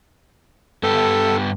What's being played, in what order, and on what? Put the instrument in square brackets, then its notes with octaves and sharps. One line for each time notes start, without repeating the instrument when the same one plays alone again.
[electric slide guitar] G2 B3 G4 [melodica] A4